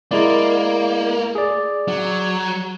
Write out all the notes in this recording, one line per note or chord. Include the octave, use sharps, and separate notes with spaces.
G#3 A#3 E4 D5
G#4 D5
F#3